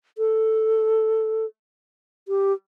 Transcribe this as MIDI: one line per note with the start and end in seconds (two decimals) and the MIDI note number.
0.18 1.46 69
2.28 2.53 67